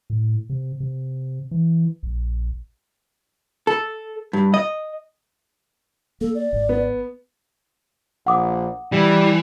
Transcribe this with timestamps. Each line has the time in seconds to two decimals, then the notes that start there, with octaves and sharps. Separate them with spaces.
0.10 A2
0.50 C3
0.80 C3
1.51 E3
2.03 A#1
3.67 A4
4.33 G2
4.54 D#5
6.21 A#3 A4
6.35 D5
6.53 G#1
6.69 B3
8.27 A#1 F#5 D6 D#6
8.92 E3 G3